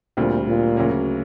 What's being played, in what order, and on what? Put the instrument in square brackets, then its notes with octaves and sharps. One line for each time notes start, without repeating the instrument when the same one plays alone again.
[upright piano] D2 D3 G3 C4 F4 [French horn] A#2
[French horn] A#2
[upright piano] D2 C#3 F#3 A#3 C#4